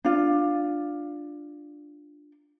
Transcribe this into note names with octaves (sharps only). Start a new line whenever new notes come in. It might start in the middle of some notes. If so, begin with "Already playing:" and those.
D4 F4